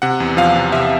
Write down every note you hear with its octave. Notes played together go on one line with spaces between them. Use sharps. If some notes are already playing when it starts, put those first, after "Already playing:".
C3 F#5
E2
F3 F5
C3
C3 E5